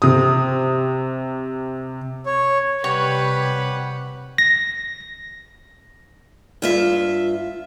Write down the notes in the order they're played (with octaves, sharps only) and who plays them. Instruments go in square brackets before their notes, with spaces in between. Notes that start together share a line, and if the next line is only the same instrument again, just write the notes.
[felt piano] C3 D#6
[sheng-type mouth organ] C#5
[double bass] C3 [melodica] G3 G4 F#5 [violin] B4 [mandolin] C#5
[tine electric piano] A#6
[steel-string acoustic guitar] G2 F4 E5